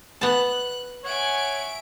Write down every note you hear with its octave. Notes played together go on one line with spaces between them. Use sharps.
B3 A5 F#6
C#5 E5 F#5 G#5 D7